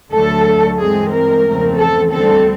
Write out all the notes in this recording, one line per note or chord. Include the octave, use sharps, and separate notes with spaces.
D2 D3 F#3 A3 A4
G2 E3 G#3 C4 G#4
A#4
E2 C#3 F3 A3 C4
A4
D2 D3 G3 C4 A4